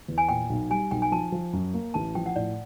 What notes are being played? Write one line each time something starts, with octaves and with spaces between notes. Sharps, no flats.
E2
G#5
A#2 G5
B1
G3 G#5
B1 G5
G#5
F3 A5
F3
F#2
A#3
A1 A5
F3 G5
F#5
A2 D5